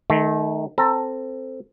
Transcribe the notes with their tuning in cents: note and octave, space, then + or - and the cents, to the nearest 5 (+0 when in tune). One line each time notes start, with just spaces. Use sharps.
D#3 +0 A3 -30
C4 +0 A4 +15 A#5 +0